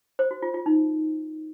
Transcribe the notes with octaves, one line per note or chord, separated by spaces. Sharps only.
C5
F#4
F4
F4
D#4